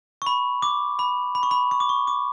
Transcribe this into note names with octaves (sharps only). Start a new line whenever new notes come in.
C#6
B5
D6
B5
B5
C#6
B5
C#6
D6
C#6
D6